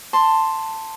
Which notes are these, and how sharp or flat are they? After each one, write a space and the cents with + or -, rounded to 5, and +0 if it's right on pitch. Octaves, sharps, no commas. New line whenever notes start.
A5 +10 C6 +0